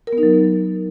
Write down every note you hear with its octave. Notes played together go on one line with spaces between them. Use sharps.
A#4
B3
D#4
F#3